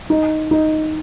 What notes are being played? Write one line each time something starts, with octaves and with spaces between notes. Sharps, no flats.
D#4
D#4